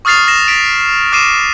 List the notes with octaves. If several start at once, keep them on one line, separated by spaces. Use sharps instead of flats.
C#6 D#6 F6 A6 C7 F7
D#6 A#6 E7
B6 D7
D6 F6 C7 D#7 E7